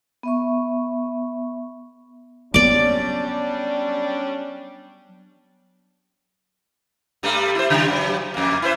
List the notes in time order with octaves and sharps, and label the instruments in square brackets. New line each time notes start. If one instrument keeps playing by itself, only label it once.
[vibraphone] B3 E5 C#6
[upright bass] F#3 B3 [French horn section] G3 C#4 D4 [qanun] D5 D6
[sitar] G2 G3 A3
E4 C5
C#3 G3
G2 F#3
F2 A#3
E4 B4 C5